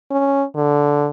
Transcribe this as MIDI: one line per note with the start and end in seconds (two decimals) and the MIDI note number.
0.11 0.44 61
0.56 1.09 50